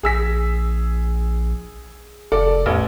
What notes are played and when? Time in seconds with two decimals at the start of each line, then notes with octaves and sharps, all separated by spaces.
0.03 A#1 G#4 E6 B6
2.32 F1 A4 D5
2.66 A1 E2